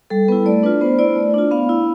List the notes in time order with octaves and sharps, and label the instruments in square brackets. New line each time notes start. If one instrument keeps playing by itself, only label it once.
[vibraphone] G3 A4
B3 E4 B4
A3 D5
D4 F4 B4
B3 C5
E4 D5
A3
D4 F4
B3 F5
E4